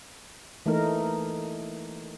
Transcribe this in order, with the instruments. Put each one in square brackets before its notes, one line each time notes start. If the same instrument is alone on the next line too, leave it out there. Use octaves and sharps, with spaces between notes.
[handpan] E3 A3 A#3 D#4 A#4